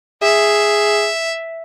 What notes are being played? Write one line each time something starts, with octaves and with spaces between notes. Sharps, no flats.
G#4 E5